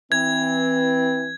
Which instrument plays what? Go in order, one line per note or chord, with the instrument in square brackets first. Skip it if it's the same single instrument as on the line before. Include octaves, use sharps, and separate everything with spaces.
[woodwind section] E3 C4 [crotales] G#6